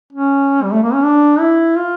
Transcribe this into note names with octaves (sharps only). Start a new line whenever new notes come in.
C#4
G3
A3
A#3
C#4
D4
E4
F4